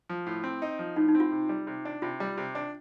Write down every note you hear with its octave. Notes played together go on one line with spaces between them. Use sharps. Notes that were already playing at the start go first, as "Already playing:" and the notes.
F3
A2
C4
D#4
F3
A2 D#4
D#4
C4
F4
C3
G3
C3
D4
C3 F4
G3
C3
D4